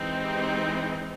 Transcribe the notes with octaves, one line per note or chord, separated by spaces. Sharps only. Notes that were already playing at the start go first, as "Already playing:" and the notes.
Already playing: E3 G#3 C4 D#4
G4